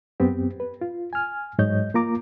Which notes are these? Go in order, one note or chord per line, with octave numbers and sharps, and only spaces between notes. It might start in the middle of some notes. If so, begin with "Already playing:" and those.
F#2 B3 C4 G4
B4
F4
G#5 F6
G#2 F#3 C#5 D#5 G6
A#3 F4 A#5 D6